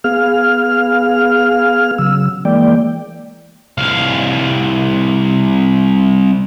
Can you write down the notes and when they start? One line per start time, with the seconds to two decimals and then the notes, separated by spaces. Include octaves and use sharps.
0.04 B3 G#4 F5 F6
1.98 C#3 F#3 E6
2.45 E3 G#3 A#3 D5 G5
3.77 C2 F5